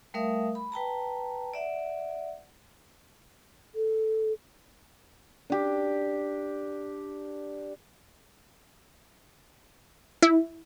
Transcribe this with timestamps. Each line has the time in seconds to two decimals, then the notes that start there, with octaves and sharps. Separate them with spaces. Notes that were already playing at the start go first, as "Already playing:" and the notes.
0.14 G3 A3 A#4 E5 F5 D#6
0.55 B5
0.72 B4 G5 A5 A#5
1.54 D5 E5 F#5
3.75 A4
5.50 D4 G4
10.22 E4